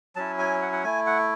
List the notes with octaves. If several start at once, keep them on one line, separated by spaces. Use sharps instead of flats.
F#3 C#4 E4 A5
G#5
F#5
F#5
A3 E4 G#5
F#5